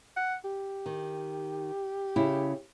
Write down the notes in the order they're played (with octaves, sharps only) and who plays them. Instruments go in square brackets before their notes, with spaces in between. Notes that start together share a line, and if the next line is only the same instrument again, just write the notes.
[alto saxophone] F#5
G4
[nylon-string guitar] D#3
C#3 E4